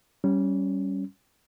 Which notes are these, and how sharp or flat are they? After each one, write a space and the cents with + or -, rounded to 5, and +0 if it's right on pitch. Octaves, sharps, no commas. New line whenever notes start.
G3 -20 C#4 +0